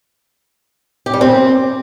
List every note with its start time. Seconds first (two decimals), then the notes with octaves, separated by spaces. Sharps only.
1.06 G4
1.14 G3
1.21 C4